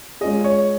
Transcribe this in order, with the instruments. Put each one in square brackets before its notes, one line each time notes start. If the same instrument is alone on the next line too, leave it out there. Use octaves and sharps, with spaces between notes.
[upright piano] G#3 C#4 F4 G#4 [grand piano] D#5
[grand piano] C#5